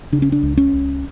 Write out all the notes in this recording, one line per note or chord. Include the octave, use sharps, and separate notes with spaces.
C#3 D4
C#4
D4
C#2
C#4
C#2